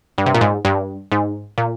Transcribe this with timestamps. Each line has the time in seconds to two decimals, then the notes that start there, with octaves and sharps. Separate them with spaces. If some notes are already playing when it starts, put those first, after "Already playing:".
0.18 G2
0.26 C3
0.34 A#2
0.41 G#2
0.65 G2
1.12 G#2
1.58 A#2